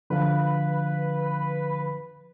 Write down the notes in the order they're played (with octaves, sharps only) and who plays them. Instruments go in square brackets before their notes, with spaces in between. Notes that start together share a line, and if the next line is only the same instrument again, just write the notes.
[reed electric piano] D3 F3 F5 [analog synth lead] B4